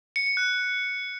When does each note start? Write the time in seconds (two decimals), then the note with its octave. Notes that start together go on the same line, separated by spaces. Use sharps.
0.16 C#7
0.26 C#7
0.37 F#6